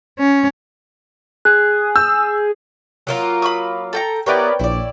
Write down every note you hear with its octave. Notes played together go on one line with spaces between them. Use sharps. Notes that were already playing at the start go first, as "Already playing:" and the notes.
C#4
G#4 F#6
E6 G6
F#3 A#3 F4
B5 C#6 D#6
A4 G5 A#5
B3 E4 G4 A#4 B4 C#5 D5 G5
A#1 E4 D5